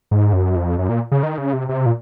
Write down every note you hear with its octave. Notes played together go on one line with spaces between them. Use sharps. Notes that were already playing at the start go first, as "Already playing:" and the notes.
G#2
F#2
F2
F#2
A#2
C#3
D#3
C#3
C3
C3
A#2